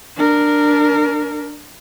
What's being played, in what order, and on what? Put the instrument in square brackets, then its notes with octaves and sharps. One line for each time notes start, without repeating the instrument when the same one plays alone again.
[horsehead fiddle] D4 A#4